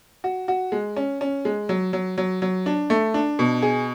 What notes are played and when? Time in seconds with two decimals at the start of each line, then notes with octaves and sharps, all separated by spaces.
0.24 F#4
0.48 F#4
0.72 G#3
0.97 C#4
1.21 C#4
1.45 G#3
1.69 F#3
1.93 F#3
2.18 F#3
2.42 F#3
2.66 D4
2.90 A3
3.14 D4
3.39 B2
3.62 G#4